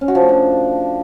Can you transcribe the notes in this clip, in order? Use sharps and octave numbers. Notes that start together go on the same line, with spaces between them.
C#4
F#4
F3
A3
D4